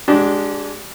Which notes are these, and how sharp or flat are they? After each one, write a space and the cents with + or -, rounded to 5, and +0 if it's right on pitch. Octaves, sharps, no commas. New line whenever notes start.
G#3 +0 D4 -5 G4 -35